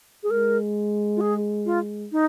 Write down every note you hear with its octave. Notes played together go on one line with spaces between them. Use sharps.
G#4
G#3 A#4
F4
G#4
F4
D#4